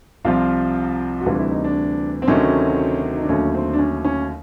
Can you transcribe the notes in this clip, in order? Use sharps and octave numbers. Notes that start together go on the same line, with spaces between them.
C2 C3 F3 F4
F#4
D2 C3 E3 G3 F4
E4
D#4
D4
C4
D2 C3 D#3 F#3 A3 C#4
D#4
D4
D#2 D3 F#3 A3 C#4
C4
D4
C#4
C#4